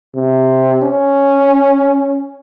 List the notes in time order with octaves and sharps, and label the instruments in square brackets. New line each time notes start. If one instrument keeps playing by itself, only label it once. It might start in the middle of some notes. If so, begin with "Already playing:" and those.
[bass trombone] C3
C#4